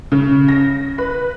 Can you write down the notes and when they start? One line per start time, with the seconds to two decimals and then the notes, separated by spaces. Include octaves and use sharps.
0.12 C#3
0.48 A#6
0.98 B4